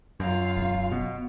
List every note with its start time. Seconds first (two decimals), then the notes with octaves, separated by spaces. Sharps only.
0.20 F#2 F4 F5
0.57 E1
0.91 B2